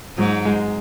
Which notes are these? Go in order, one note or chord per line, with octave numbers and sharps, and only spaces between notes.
G#2 F#3
G#3